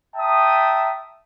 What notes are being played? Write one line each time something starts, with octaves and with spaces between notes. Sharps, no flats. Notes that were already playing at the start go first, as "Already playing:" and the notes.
E5 G5 A5 A#5 D#6